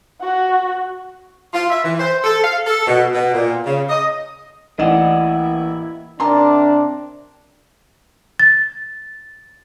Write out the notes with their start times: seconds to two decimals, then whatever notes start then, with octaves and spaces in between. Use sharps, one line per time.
0.21 F#4 F#5
1.54 F4
1.70 E5
1.84 E3
1.99 C5
2.24 A4
2.43 F5
2.66 A4
2.87 B2
3.14 B2
3.33 A#2
3.65 C#3
3.89 D#5
4.79 A1 A#3 E4 D5 D#5 F#5 E7
6.20 C3 D4 A#4 D5 A5 A#5 C6
8.40 A6